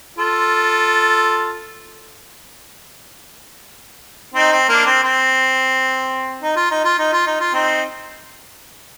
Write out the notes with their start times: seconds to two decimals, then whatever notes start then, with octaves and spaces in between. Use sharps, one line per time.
0.18 F4 A4
4.34 C4 D#4
4.51 C4
4.69 A#3 D4
4.86 C4
5.03 C4
6.43 D#4
6.56 F4
6.71 D#4
6.84 F4
6.99 D#4
7.13 F4
7.27 D#4
7.40 F4
7.54 C4 D#4